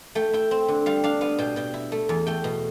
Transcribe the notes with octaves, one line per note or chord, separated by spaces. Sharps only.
A3 G5
E4 G5
C4
D3
G3 F5
D4 F5
B3 F5
B2 G5
B2 G5
E4
A3
E2
A3 G5
B2